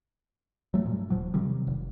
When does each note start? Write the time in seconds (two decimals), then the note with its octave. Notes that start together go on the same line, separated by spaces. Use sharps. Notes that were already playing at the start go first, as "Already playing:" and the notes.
0.74 F#3 A3
0.85 G2 A#2
1.10 D#1 F3 F#3
1.34 C3 D#3 F#3 G3
1.67 F1